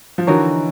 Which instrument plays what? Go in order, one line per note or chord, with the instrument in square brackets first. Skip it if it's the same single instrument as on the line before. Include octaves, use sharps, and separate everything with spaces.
[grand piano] F3
[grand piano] D3 E3 [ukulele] D#4 F#4 A#4 C#5